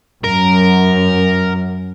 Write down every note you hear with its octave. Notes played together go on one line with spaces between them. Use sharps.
F#2 A#4